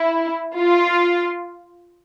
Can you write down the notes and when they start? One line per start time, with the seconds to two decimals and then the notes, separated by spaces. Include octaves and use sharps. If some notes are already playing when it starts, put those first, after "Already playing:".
Already playing: E4
0.56 F4